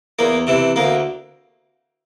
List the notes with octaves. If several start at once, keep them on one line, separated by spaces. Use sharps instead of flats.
E2 A#3
C3 E3
D2 A#3